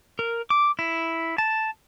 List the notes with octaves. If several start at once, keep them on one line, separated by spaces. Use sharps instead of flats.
A#4
D6
E4
A5